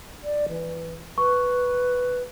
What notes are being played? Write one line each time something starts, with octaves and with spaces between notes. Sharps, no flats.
D5
E3
B4 C#6